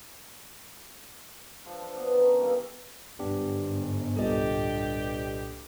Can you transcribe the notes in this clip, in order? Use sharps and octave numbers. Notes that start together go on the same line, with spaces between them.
F3 D4 A4
C5
B3 D4
D#3 B3
C#4 D#4
E3 G3 A#3 E4
G1 G#2 B3 D4 G4
C2 G2 A#2 G4 A4 D#5